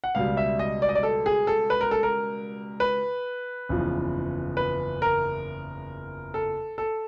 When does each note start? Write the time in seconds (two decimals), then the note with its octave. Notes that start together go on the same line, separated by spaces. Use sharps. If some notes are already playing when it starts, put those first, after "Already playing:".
0.04 F#5
0.15 C#2 B2 G3 F5
0.37 E5
0.59 D#5
0.82 D5
0.89 D#5
0.95 D5
1.03 A4
1.26 G#4
1.47 A4
1.70 B4
1.81 A#4
1.91 A4
2.03 A#4
2.80 B4
3.69 F#1 E2 C#3 F3
4.57 B4
5.02 A#4
6.34 A4
6.78 A4